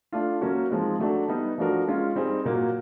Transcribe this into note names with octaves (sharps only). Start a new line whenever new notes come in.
A3 D4 F4
F#3 A#3 C#4 F#4
F3 G#3 C4 D#4
F#3 A3 D4 F#4
G3 B3 D#4
F3 A3 D4 F#4 A#4
G#3 C#4 F4
G3 C4 D#4 G#4
A#2 F#3 A#3